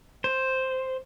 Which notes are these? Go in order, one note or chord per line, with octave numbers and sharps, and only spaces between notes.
C5